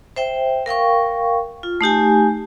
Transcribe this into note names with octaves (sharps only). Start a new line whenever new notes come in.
C5 E5 G5
A#4 F5 G5 C#6
F4
A3 D#4 G4 G#5